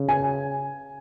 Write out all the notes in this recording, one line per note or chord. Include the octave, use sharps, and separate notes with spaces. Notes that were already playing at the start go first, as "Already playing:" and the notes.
Already playing: C#3
G#5